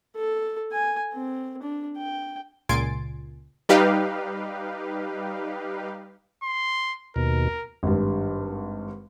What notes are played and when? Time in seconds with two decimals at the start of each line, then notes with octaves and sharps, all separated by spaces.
0.16 A4
0.72 G#5
1.14 C4
1.62 D4
1.98 G5
2.69 C#2 A#2 G#5 C6 A6 D7
3.69 G3 D#4 G4 B4 F5
6.43 C6
7.16 D#2 B2 A#4
7.83 G#1 G2